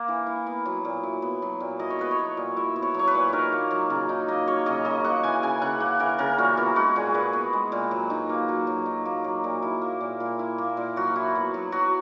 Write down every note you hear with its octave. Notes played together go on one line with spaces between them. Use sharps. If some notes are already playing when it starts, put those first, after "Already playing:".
Already playing: A#3
E3
E4
B3
F#3
A#2
E4
B3
F#3
A#2
E4 D#5
C#5
B3 B4
C#5
F#3
A#2
E4 E5
B3
C#5
F#3 C#5
B4
A#2
D#4 A#4
A#3
F#3
C#3
D#4
A#3 D#5
F#3 C#5
C#3 D#5
C#3 D#5
A#3 F#5
E3 G#5
C#3 G#5
C#3 F#5
A#3 F#5
E3 A#4
C#3 A#4
A#2 F#4
B3 E4
G#3 F#4
A#2 G#4
A#2 B4
B3
G#3
A#2
F#3
D#4
A#3
F#3
F#3
D#4
A#3
F#3
A#2
E4
A#3
A#2
A#2
E4
A#3
A#2
F#3 F#4
E4
B3
F#3
F#3 F#4